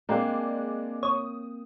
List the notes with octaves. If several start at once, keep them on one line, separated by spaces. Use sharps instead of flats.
G#3 A#3 C4 D4
C#5 D#6